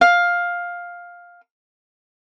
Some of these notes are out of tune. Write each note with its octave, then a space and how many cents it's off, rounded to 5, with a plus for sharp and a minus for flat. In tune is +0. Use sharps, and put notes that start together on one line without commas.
F5 +10